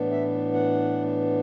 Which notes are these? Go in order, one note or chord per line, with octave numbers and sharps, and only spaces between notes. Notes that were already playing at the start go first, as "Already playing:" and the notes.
Already playing: A2 E3 B3 D4
E5
F#5